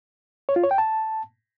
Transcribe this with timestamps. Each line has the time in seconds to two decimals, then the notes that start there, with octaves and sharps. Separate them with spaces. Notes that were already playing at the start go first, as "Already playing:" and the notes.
0.49 C#5
0.56 F4
0.63 C#5
0.71 G5
0.78 A5